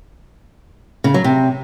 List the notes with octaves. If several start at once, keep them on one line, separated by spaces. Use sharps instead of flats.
C#3
F#3
C3